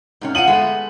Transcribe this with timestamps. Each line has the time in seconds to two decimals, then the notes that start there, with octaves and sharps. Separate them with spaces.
0.21 G#2 C3 C#4
0.35 F4 F5 F#5 D#7 F#7
0.47 G#3 A3 B3